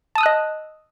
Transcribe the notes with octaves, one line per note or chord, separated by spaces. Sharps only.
D#5 A5 D#6 E6 F#6